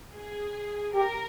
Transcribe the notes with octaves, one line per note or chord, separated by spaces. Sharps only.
G#4
G4 A#4